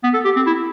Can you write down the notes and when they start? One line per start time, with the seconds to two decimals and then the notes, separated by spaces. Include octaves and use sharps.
0.03 B3
0.14 A4
0.25 G4
0.36 C4
0.47 E4